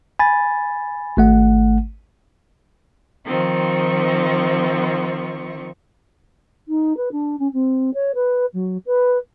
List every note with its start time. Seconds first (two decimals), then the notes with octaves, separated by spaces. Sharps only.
0.19 G#5 B5 A6
1.17 G#1 A3 F#5
3.26 D#3 F3 C4 F4 C#6
6.68 D#4
6.97 B4
7.12 D4
7.39 C#4
7.53 C4
7.94 C#5
8.14 B4
8.53 F#3
8.86 B4